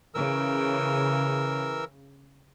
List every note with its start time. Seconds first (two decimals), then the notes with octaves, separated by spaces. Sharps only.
0.14 C#3 E3 A#4 E6